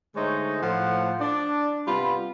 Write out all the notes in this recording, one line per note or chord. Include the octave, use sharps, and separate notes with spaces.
D3 G#3 A3 D#4 C5 C#5
A2 F3 F#5
D4 D5
C3 G3 B3 F4 B5